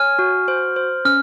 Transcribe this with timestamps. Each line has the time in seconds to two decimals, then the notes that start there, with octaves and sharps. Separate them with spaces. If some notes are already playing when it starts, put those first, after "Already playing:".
Already playing: C#5 G#5 F6
0.19 F#4
0.48 C5
0.76 C5
1.05 C#4 F6